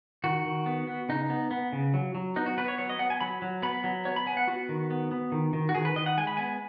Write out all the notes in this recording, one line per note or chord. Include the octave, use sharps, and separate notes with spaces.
D#3 F#4
D#3
B3
B3
C#3 D#4
B3
B3
C#3
F#3
F#3
B3 D#4
F#4
B3 B4
C#5
F#3 C#5
D#5
B3 F#5
G#5
F#3 B5
F#3
B3 B5
F#3
B3 C#5
B5
B3 G#5
F#5
B3 F#4
D#3
B3
B3
D#3
D#3
F#4
D#3 G#4
B4
D#3 D#5
F#5
G#3 G#5
B5
B3 G#5